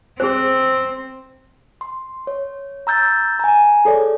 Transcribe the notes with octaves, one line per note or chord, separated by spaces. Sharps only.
C4 G#4 C5
C6
C#5
A#5 E6 G6 A6
G#5 A#5
G#4 A4 C#5 D5